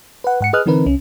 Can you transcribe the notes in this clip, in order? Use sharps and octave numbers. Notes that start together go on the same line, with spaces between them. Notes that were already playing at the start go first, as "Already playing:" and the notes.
B4 F#5
G#2 F#5 C#7
G#4 B4 D#5 D#6 F6 F#6
D3 E3 C4 D#4 A#4 B4
C2 C#4